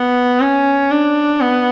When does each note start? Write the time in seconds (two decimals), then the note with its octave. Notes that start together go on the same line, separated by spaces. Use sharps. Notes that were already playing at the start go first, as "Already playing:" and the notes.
Already playing: B3
0.41 C#4
0.91 D4
1.41 B3